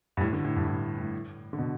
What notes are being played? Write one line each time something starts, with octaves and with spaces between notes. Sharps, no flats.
G2
A2
D3
A2
G2
A2
A2
D3
B2